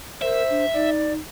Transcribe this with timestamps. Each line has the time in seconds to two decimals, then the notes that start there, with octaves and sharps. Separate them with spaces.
0.22 A#4 C5 E5
0.50 D4
0.74 D#4 D5